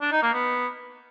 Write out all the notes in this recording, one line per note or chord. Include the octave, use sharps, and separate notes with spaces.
D4
D#4
A#3
B3